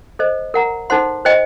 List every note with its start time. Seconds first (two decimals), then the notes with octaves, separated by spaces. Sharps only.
0.19 A4 C5 D#5
0.54 A#4 F#5 A#5
0.90 D#4 A4 C5 F#5 C6
1.25 C5 D#5 G5